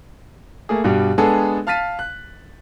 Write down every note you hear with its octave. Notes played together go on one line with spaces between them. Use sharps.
A3 A#3 G#4
G2 B2 G3
G#3 B3 D4 G#4 A4
F5 A5 F6 A6 B6 D#7
F#6